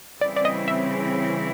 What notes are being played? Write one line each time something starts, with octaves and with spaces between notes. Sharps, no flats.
C#3 E3 G3 C4 E4 D5
D5
D#5
E5